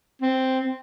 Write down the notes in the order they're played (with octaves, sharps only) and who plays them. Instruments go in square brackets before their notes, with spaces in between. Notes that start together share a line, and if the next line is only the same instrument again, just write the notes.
[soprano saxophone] C4